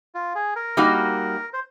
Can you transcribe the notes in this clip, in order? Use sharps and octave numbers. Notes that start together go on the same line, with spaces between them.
F4
G#4
A#4
G3 A#3 D#4 F#4
C5